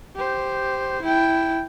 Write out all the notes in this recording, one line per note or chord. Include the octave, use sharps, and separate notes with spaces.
G4 C5
E4 G5